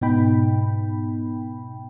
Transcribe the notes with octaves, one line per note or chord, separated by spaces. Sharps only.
G#2 B2 B3 D#4 G5 B5